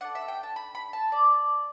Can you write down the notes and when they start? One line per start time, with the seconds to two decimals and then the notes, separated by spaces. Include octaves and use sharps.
0.01 D4 A4 F#5
0.15 E5
0.28 G5
0.43 A5
0.56 B5
0.75 B5
0.93 A5
1.12 D5